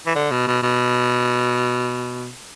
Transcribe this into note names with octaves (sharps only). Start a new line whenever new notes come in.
E3
D3
B2
B2
B2